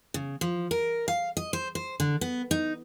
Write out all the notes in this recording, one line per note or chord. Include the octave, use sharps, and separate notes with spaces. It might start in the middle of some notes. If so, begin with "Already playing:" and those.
C#3
F3
A#4
F5
D#5
C5
C5
D3
B3
D#4